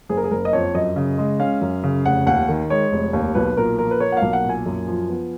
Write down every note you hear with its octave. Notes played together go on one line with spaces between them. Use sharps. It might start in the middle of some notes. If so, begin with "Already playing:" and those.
F#1 G#4
A#4
G#4
F#1 A#4
D#5
F2 C#5
F#2 D#5
C#3
G#3
C#4 F5
F#2
C#3
F1 F#5
D#2 F#5
D#3
G#3 C#5
F1
D#2
B1 B4
A#2 A#4
F3 A#4
B4
A#3 C#5
F#5
B1 F5
F#5
A#2
G#5
F#2
F3
B3